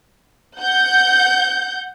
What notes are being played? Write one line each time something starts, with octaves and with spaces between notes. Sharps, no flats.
F#5 G6